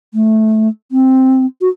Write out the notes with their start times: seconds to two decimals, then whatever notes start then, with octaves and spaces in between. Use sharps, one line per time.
0.14 A3
0.92 C4
1.61 F#4